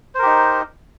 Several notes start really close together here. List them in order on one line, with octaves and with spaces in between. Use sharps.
C5 A#4 G4 D#4